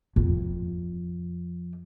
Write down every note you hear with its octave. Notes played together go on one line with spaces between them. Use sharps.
F2